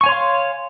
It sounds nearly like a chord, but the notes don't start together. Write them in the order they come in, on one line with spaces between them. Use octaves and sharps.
C#6 G#5 C#5 C6 F5